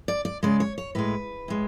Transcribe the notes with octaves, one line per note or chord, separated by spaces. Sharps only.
D5
D5
C#3 G#3 D5
C#5
C#5
A2 G#3 B4
A2 G#3